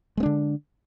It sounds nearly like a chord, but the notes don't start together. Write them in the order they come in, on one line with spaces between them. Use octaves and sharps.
G#3 B3 D4 D3